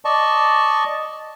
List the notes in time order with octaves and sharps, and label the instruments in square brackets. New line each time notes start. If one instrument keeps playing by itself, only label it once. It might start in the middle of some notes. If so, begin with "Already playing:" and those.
[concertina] D5 D#5 A5 C#6